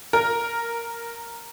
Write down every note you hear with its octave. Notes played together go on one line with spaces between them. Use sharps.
A#4